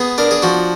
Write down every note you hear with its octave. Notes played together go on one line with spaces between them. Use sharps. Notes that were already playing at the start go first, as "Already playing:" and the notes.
Already playing: B3 G#4
D4 A#4
G#4
F3 F#4